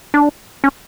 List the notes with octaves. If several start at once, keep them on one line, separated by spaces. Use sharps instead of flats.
D4
C#4